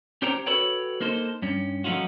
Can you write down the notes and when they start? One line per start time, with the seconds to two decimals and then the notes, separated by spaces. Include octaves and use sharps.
0.22 C#4 G4 C5 C#5 G5 A#5
0.46 F#4 A4 B4 C#5 G5
1.01 A#3 D#4 A4 C5
1.42 G2 C#4
1.84 F3 A3 C#4 D#4 F4 F#4